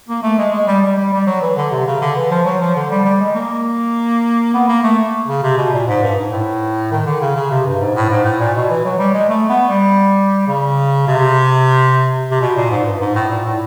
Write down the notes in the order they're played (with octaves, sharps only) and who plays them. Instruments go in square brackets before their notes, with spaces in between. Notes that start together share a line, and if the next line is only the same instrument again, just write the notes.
[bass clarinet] A#3
A3
G#3
G#3
G3
G3
G3
G3
F#3
E3
D3
C3
C#3
D3
E3
F3
F#3
F3
D3
G3
G3
G#3
A#3
B3
A#3
A3
C#3
C3
B2
A#2
G#2
G2
G#2
A2
D#3
D3
C#3
C#3
C3
G2
G#2
A2
G#2
A2
A#2
B2
E3
F#3
G3
G#3
A3
B3
G3
C#3
C3
C3
B2
A#2
G#2
G2
G#2
A2
A#2
A2